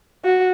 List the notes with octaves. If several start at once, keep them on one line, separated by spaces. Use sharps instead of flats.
F#4